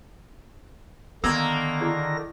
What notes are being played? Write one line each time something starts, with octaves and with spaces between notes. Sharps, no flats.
D3 D#3 A#3 B3 E6 A#6
E4 G#4 D5